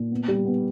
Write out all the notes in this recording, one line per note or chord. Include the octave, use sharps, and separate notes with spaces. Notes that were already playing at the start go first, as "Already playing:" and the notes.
Already playing: A#2
B3
G3
B3